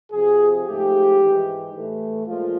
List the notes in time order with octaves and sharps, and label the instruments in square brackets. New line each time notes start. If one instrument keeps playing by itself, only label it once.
[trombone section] F2 C3 F3 G#4
G#2 F3 A3 G4
G#2 E3 G#3
A2 E3 A3
A#2 F3 G#3 F4